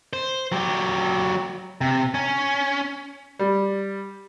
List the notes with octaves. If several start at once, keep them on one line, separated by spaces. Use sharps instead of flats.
C5
F#3 G4
C3
C#4
G3